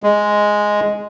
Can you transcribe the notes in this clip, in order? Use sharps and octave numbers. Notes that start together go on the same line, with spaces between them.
G#3